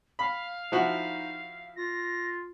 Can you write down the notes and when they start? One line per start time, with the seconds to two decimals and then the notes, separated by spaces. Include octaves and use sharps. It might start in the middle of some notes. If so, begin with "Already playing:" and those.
0.19 F5 B5
0.72 F3 D#4 E4 F#4
1.76 F4 A#6